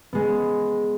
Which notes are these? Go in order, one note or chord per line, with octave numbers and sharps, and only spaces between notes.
G#3 B3